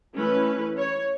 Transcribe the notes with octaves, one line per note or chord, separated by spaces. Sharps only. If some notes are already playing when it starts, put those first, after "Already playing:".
E3 A3 C#4 B4
C#5